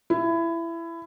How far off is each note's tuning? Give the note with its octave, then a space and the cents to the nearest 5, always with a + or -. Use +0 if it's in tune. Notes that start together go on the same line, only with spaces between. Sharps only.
E4 +20